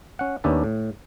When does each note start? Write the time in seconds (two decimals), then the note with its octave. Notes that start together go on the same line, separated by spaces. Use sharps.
0.19 C#4 F#5
0.44 D#2 B3 C#4 D4 E5 A5
0.64 A2